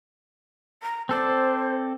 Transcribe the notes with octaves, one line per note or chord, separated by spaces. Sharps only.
A#5
C4 A4 C5 D5